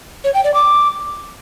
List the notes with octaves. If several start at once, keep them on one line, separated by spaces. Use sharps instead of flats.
C#5
G5
D5
D6